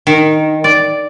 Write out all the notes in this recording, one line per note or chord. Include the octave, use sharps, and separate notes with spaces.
D#3
D5